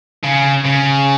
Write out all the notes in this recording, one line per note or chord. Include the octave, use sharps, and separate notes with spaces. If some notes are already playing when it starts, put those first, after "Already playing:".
C#3
C#3